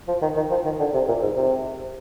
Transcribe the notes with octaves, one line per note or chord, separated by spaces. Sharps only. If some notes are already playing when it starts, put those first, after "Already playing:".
F3
D#3
D#3
F3
D#3
D3
C3
A#2
G#2
C3